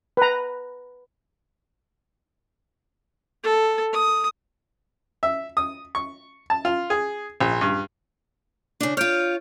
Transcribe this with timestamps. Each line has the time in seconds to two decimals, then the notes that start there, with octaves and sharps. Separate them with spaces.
0.17 B4 A#5
3.44 A4
3.93 D#6
5.23 E5
5.57 D#6
5.95 C#6
6.50 A5
6.65 F4
6.90 G#4
7.41 A#1
7.61 G2
8.80 C#3 D4
8.97 F4 C#5 F6 G6 D7